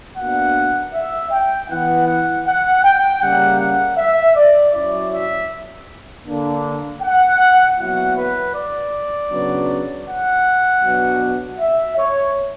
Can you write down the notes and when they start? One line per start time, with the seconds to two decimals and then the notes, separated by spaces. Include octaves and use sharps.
0.17 B2 A#3 D4 F#5
0.93 E5
1.31 G5
1.69 E3 B3 E4 F#5
2.07 F#5
2.45 F#5
2.84 G5
3.21 C#3 G3 A#3 F#5
3.59 F#5
3.97 E5
4.36 D5
4.73 F#3 C#4 E4 D5
5.12 E5
6.26 D3 A#3 D4
7.02 F#5
7.78 B2 F#3 A#3 E4 F#5
8.17 B4
8.55 D5
9.31 C#3 F#3 B3 D4
10.07 F#5
10.83 B2 F#3 B3 D4
11.59 E5
11.97 C#5